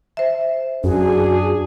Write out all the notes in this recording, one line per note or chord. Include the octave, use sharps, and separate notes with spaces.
C5 E5
F#2 D4 F#4 G#4